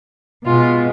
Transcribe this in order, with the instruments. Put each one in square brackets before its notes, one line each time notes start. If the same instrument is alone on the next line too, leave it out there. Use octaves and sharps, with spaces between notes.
[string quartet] B2 G#3 F4